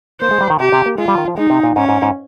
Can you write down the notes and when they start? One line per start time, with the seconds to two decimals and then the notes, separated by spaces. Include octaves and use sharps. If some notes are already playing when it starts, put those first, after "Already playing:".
0.21 A#3 C5
0.31 G#3
0.41 G3
0.50 D#3
0.60 C3 G4
0.72 C3
0.86 A#3
0.98 G#3 F4
1.08 G3
1.18 D#3
1.28 F3
1.37 G#3 D#4
1.50 C3
1.63 A#2
1.76 G#2 C#4
1.89 G#2
2.02 G#2